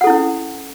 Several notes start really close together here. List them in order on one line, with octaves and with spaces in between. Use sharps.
F#5 A4 E4 C#4